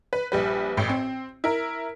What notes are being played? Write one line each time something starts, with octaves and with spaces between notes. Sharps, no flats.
B4
A#1 G3 B4
A1 A2
C4
E4 A#4